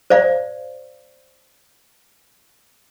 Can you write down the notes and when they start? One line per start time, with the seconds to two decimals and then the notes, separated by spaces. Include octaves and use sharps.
0.10 C5 D5 F5